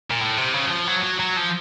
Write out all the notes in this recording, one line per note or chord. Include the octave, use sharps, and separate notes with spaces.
A#2
A2
C3
C#3
F#3
F3
F#3
F#3
F#3
F3